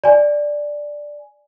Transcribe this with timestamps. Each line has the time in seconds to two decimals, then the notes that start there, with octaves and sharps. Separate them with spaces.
0.04 D5 G#5